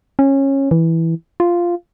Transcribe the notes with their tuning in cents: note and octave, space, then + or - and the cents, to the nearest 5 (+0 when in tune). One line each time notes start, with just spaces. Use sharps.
C#4 -20
E3 -5
F4 -5